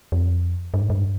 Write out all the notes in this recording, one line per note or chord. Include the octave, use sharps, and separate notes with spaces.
F2
G2
G#2
G2